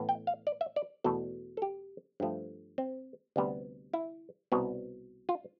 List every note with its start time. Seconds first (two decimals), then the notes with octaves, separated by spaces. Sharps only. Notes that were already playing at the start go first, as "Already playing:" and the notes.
Already playing: A2 E3 B3
0.09 G5
0.27 F5
0.47 D5
0.61 E5
0.76 D5
1.04 E2 B2 A3 A4
1.57 A4
1.62 G4
2.20 G2 F3 A3
2.78 C4
3.36 D2 C3 G3 B3
3.94 E4
4.52 C2 B2 B3
5.29 F4